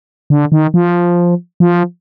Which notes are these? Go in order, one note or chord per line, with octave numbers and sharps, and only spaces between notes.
D3
D#3
F3
F3